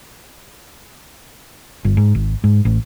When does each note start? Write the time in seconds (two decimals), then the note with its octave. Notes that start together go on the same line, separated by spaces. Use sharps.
1.85 G1
1.97 G#2
2.15 G#1
2.44 G#2
2.65 A1